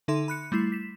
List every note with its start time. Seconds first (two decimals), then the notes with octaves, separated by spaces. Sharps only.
0.08 D3 D#4 A4 E5 C6 D#7
0.28 B5 F#6 C#7
0.52 G3 A3 E4 C7
0.72 B6 E7